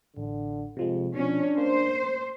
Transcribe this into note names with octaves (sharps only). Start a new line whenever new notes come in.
A1 D3
F2 C3 F3 G#3
B2 F3 C#4 D4
A#3 C5